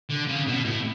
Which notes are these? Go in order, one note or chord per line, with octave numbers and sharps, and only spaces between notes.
D3
C#3
B2
A2